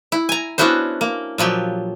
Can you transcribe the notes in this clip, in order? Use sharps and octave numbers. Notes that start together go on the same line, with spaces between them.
E4
G#5 A#5
B3 C#4 D4 E4 F#4 C5
A#3
A#2 F3 F#3 G4